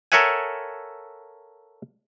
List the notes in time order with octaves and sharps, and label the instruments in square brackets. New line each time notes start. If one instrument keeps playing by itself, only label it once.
[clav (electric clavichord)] A4 A#4 C#5 E5 F#5 G#5